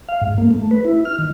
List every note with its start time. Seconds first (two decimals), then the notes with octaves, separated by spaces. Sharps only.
0.09 F5
0.22 G#2
0.38 A#3
0.51 A3
0.71 B4
0.85 E4
1.05 F6
1.19 D#3